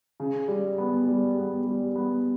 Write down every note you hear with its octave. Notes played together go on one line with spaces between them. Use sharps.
C#3
G3
B3
G3
B3
G3
B3